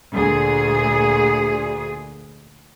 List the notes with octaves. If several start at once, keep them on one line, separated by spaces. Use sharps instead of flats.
D2 A#2 G#4